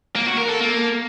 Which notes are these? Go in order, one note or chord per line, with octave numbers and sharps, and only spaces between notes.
A#3
F#4
A#4
A4
A#3